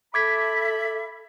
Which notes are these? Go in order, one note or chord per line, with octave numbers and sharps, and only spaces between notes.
A4 E5 B5 D6 G#6 B6